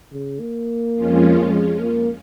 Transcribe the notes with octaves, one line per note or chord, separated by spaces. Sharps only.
C#3
A#3
F2 F3 G#3 C#4 F4
G#3
A#3